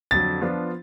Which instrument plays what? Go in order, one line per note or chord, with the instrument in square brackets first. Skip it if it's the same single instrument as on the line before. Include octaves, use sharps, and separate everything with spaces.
[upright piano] F2 D3 F#3 [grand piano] A6
[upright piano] F3 B3 D4 F4